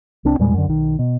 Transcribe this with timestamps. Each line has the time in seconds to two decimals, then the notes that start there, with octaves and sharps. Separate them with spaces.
0.25 C2 C4 D4
0.39 E2 A#2 G3 G#3
0.54 F#2 D3
0.68 B1 D#3
0.99 B2